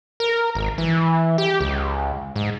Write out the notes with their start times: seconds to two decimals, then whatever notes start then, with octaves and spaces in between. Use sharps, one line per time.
0.20 A#4
0.55 G#1
0.78 E3
1.38 G4
1.61 C#2
2.36 G#2